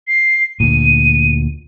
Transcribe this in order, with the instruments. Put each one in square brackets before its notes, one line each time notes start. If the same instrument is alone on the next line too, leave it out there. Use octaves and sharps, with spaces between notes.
[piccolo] C7
[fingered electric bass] D2 A#2 [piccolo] D#7